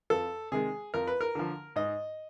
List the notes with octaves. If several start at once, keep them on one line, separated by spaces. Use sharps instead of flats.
F2 A4
C3 D#3 G#3 G#4
F2 A#4
B4
A#4
D3 F3
G#2 D#5